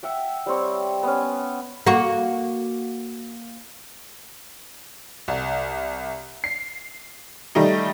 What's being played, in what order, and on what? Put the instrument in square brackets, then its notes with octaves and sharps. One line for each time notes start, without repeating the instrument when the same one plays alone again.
[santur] E5 F#5 G5
G3 C4 C#5
B3 C#4
[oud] A#3 F#4
[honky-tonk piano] C2
C7
D#3 G3 A3 D#4